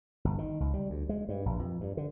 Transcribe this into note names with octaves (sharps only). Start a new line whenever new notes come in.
G1
D#3
C#2
G3
D2
G#3
G2
A#1
F2
G2
D3